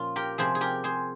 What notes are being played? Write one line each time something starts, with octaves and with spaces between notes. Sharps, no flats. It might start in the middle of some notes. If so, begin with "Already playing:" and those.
Already playing: A#2 F3 C#4 F4
G4 A#4
C3 F3 G#4 C5
G#4
G4 A#4
G#4 C5